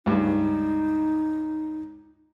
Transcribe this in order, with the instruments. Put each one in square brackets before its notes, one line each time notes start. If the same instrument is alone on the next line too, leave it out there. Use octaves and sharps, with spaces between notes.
[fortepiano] C#2 G2 [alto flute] D#4